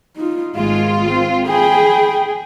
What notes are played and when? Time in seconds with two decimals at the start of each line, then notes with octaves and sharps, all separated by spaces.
0.17 D#4 F4
0.56 G#1 G#3 F4
1.10 C4
1.47 G#4 G5 B5